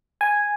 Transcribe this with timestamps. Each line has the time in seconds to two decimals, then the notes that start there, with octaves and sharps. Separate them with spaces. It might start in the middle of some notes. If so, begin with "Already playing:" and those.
0.21 G#5